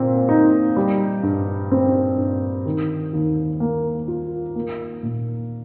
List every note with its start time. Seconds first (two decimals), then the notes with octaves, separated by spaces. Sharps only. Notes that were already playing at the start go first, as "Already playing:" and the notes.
Already playing: A#2 C4
0.29 D#4
0.77 G3
1.23 G2
1.71 C4
2.18 G2
2.66 D#3
3.13 D#2
3.60 A#3
4.08 F4
4.55 A#3
5.03 A#2